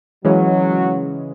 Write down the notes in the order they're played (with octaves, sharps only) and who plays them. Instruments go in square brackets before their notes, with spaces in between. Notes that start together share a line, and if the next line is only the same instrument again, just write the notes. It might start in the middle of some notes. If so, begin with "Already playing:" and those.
[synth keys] C#3 E3 G#3 C#4 [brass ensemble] F#3